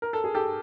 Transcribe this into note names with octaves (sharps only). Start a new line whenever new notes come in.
A#4
A4
G#4
G4 A4